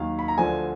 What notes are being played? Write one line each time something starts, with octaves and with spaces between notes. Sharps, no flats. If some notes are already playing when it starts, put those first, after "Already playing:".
Already playing: D#2 D#3 F#3 F5
B5
A#5
D2 D3 F3 G#5